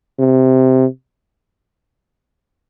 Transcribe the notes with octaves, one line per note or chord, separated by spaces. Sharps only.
C3